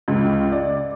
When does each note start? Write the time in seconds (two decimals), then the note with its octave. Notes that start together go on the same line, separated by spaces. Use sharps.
0.08 C#2
0.52 D5